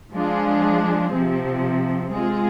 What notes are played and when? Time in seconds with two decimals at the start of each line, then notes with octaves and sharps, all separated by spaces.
0.12 F3 G#3 D4 F4 G#4
1.11 C3 F3 C4
2.10 G#3 C4 F4 G#4